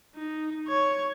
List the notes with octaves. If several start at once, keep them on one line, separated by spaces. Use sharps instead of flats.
D#4
C#5